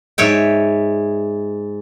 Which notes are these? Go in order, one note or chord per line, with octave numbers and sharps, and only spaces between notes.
G#2 C#5 E5 G5